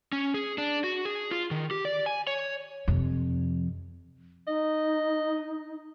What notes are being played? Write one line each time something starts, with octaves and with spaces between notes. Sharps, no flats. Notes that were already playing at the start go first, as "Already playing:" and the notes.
C#4
G#4
D4
F#4
G#4
F4
D#3
G4
D5
G#5
C#5
F2 C3
D#4 D#5